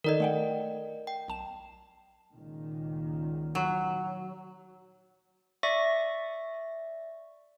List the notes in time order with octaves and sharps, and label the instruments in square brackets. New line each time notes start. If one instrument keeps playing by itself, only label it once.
[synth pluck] D#3 D#4 A4 [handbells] A#4 D5 D#5
[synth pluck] A3 F#5 G5
[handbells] G5
[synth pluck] B1 A5 E7
[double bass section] C#2 A#2 D#3
[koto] F#3
[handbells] D5 E5 C#6 A#6